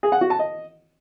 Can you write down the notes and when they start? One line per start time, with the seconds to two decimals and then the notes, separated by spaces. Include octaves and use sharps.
0.03 G#4
0.12 F#5
0.21 F#4
0.30 A5
0.39 D#5